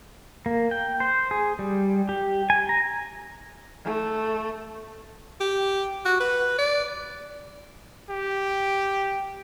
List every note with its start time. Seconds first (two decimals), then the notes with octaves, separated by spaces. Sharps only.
0.46 A#3
0.71 G5
1.00 C5
1.31 G#4
1.59 G3
2.09 G4
2.50 G#5
2.69 A#5
3.84 A3
5.40 G4
6.06 F#4
6.20 B4
6.59 D5
8.10 G4